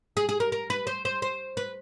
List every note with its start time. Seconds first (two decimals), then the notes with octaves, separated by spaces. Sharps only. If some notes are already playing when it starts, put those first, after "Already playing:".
0.17 G#4
0.29 G#4
0.40 A#4
0.52 A#4
0.70 B4
0.87 C5
1.05 C5
1.22 C5
1.57 B4